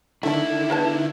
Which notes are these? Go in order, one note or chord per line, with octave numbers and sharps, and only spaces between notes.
D3 D#3 A3 E4 A4
G#3 B3 A5